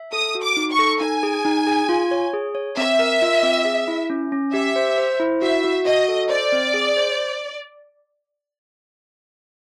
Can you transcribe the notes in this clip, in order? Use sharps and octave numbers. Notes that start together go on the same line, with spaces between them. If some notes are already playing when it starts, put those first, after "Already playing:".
Already playing: E5
A4 D#6
F#4
D6
D#4
C#6
A4
D#4 G#5
G#4
D#4
G#4
F4
C#5
G#4
C#5
C4 E5
A#4
F4
C4
G#4
E4
C#4
C#4
G4 E5
C5
C5
E4
F#4 E5
F#4
F#4 D#5
A4
C5 D5
C4
G#4
C5